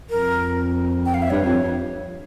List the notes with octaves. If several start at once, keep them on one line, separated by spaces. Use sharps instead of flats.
F2 A#4
G5
F5
E5
G2 C#5
F2